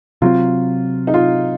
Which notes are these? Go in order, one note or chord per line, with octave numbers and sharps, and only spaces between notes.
C3 F#3 C4 F4
D#4
F4